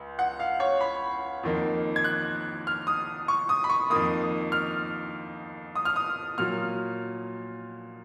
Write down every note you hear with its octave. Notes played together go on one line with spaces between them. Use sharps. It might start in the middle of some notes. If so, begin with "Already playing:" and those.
Already playing: C#2
F#5
F5
C#5
B5
F2 D#3 A#3
G#6
F#6
F6
D#6
C#6
D#6
B5
C#6
F2 D#3 A#3 D#6
F6
D#6
F6
D#6
A#2 F#3 F6